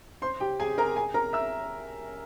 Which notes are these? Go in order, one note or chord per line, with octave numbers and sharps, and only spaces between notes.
C5 C6
G4 G5
G#4 G#5
A#4 A#5
G#4 G#5
A#4 A#5
E5 E6